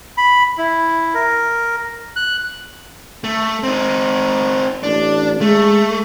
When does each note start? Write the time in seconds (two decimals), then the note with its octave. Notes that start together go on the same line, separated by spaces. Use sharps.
0.18 B5
0.58 E4
1.15 A#4
2.16 F#6
3.24 A3
3.63 C4 D#4
4.83 A1 D4
5.41 G#3 A3